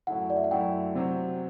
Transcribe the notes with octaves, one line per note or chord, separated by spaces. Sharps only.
F#2 F#3 A3 E4 F#5
D5
E5
F#5
F#2 F#3 A3 E4 G5
C3 F#3 C4